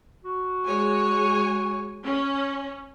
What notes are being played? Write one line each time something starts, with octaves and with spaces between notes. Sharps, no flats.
F#4
G#3 C#5 G#5
C#4